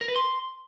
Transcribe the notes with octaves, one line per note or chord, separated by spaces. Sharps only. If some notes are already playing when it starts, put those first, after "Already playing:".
A#4
B4
C6